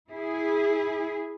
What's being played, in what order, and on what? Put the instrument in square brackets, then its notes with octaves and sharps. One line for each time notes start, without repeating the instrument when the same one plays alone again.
[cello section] E4 G#4